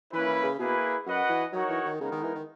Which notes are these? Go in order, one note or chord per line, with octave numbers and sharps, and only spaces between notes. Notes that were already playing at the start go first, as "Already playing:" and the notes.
E3 A#3 C#4 E4 B4
E3
C#3
B2 A#3 E4 G#4 B4
F#2 F#4 B4 D#5 F#5
E3
F#3 D#4 F#4 A#4 C#5
E3
D#3
C#3 G#3 B3 D#4 A#4
D#3
E3
D#3